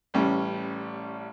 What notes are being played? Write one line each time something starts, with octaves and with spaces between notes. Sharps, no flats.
A1 G3 C#4